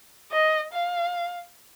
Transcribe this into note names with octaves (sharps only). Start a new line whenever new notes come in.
D#5
F5